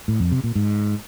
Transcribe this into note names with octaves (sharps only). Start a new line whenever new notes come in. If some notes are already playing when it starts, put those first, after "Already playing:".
A2
F2
C3
A#2
G#2